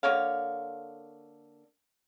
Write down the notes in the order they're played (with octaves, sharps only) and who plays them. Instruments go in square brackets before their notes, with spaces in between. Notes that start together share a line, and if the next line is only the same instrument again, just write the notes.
[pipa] D3 A#3 C#5 F5